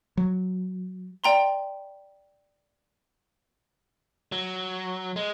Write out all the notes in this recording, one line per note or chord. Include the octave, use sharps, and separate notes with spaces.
F#3
D5 G5 A#5 C6
F#3
G#3